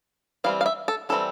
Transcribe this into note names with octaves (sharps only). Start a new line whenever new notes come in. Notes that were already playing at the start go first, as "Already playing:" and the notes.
E3 G3 C4 F5
F5
E5
A4
E3 G3 C4 A4